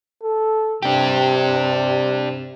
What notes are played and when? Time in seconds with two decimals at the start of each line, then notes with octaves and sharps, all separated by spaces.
0.22 A4
0.83 C3 D4 G4